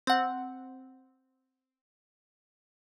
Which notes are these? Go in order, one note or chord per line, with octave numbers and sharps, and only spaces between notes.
C4 F#5